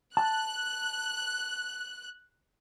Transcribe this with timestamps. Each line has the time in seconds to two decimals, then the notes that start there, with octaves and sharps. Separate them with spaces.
0.17 A5 F#6